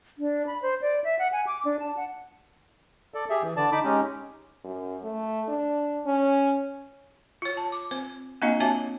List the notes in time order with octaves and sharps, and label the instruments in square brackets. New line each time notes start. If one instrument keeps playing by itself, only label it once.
[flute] D4
B5
C5
D5
E5
F#5
G#5
D6
D4
A5
F#5
[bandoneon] A4 D5
G4 G#4 E5
E3
D3 D5 A5
D#4 B5 D6
G#3 C#4 D#4 G4
[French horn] F#2
A3
D4
C#4
[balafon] F4 C#5
A5
D6
C4 C5
A#3 C4 D4 F4 D#5 F5
C4 F#4 C#5 E5 A5